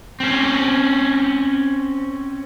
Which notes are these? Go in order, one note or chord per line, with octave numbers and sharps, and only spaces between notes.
C4 C#4